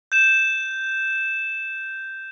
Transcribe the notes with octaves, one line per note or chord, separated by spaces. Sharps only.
G6 E7